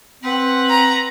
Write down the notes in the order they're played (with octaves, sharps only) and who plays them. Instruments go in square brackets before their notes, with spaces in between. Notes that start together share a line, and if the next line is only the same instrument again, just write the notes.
[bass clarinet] C4 [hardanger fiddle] B4 F#5
[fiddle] A#5